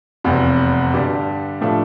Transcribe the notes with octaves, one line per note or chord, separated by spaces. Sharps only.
F1 E2 C3
G2 D3 G3
A2 F3 A3 D4